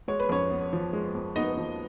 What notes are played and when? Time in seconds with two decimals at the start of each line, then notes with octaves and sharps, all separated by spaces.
0.08 G#3 C#5
0.20 B4
0.29 F2 C#4 C#5
0.50 B3
0.73 F3
0.93 G#3
1.15 F2
1.36 B3 D#4 D#5
1.57 F3